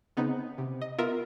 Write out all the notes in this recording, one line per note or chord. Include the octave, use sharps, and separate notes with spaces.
C#3 B3 C4 D#4
C3
D#5
B3 F4 A#4 E5